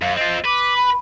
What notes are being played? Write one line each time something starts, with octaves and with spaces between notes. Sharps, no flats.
F#2 F5
C4 F4 D#5
B4 D6
B5